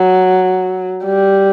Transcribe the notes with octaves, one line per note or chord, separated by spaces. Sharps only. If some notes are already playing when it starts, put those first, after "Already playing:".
Already playing: F#3
G3